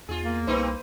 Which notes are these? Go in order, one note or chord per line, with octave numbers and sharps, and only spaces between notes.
E2 F4 G#4
A#3
C2 A#2 C4 D#4 B4 C5